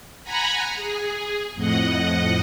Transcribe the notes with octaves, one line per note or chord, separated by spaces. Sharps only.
F#5 G#5 A#5 B5
G#4
F2 A2 D#5 F#5